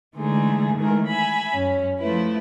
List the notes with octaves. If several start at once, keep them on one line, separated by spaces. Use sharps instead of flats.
D3 E3 G#3 A3 D#4 G#4
D#3 E3 G#3 A3 G#4 A#4
E5 G#5 B5
F#2 C#4
F3 A3 E4 B4